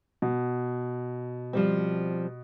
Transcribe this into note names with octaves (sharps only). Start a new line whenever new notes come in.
B2
F3 G3 C4